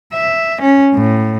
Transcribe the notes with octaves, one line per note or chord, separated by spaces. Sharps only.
E5
C#4
A2